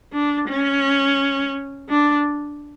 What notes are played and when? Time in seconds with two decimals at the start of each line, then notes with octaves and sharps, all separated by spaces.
0.13 D4
0.49 C#4
1.90 D4